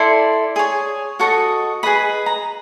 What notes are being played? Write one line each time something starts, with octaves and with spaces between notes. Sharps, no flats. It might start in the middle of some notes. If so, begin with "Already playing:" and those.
Already playing: E4 A4 D5 C6
G#4 C#5
F#4 A4 D#5 C#6
G#4 B4 D#5 B5
A#5